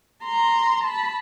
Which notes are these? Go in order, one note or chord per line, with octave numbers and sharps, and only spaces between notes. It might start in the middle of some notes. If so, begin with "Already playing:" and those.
A#5 C6
A5 B5